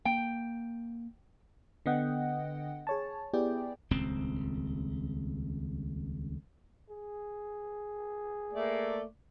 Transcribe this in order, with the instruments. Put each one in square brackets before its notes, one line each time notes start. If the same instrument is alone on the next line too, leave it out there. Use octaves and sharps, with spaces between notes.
[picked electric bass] A#3 [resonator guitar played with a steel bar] G5
[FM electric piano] D3 B3 D#5 F#5 G5
G#4 C#5 A5
B3 E4 G4 G#4 D5 G5
[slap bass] D#1 C#2 C4
[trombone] G#4
[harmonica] A3 A#3 D5